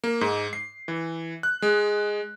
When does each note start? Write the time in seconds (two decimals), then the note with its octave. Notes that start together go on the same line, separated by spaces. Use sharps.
0.04 A#3
0.21 G#2
0.53 C7
0.88 E3
1.43 F#6
1.62 G#3